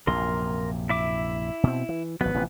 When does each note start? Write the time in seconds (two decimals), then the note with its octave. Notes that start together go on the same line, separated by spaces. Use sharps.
0.07 A#1 F#2 C3 A#4 C6
0.89 E4 E5 D6
1.63 B2 C4
1.89 E3
2.21 G#1 F#3 B3 B4
2.34 A1 C3 F3